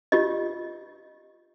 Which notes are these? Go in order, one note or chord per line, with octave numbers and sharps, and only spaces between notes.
F4 G4 D#5